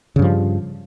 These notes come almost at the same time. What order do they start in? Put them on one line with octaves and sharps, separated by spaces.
C#3 G2 F3